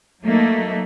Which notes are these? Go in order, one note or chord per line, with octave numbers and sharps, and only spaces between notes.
F#3 A3 A#3 D#4